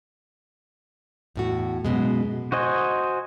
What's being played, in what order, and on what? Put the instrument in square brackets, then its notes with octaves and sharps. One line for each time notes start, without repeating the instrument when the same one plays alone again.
[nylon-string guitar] E2 A2 F#4
F#2 B2 G#3
[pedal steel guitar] F#4 C5 D#5 G#5